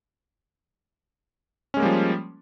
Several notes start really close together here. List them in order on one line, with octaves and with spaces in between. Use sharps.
C#4 G#3 A#3 G3 F3